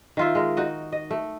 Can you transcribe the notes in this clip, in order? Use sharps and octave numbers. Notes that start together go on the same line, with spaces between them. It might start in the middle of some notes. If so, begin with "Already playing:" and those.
D#3 F4 E5
G#3 A#4
D#4 F#4 D#5
D#5
A3